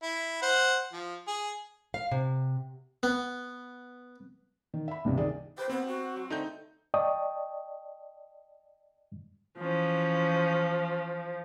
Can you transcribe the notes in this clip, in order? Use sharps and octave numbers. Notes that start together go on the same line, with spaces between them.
E4
C5 F#5
F3
G#4
F5
C3
B3
D#3
E5 B5
C#2 G2 C3
D#3 G#4 D5
G4 B4 C5
B3 C4
F#4
F#3
D3 A3 C4 D#4 G6
D5 D#5 G5 A5 C#6 D#6
E3 F3 C#4